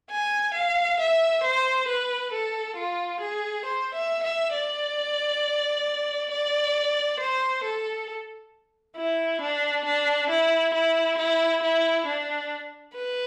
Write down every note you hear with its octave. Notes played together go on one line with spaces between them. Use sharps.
G#5
F5
E5
C5
B4
A4
F4
G#4
C5
E5
E5
D5
D5
C5
A4
E4
D4
D4
E4
E4
E4
E4
D4
B4